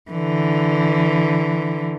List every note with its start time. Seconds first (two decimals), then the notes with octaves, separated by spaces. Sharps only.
0.11 D3 E3